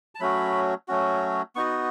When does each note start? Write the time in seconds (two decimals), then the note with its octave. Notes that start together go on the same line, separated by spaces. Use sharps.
0.15 A5
0.20 F#3 A3 C#4 F#4 B5
0.88 F#3 A3 C#4 F#4
1.55 B3 D#4 F#4 C#6